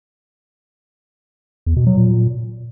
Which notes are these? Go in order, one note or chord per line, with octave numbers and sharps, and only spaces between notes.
E2
B2
F#3
A#2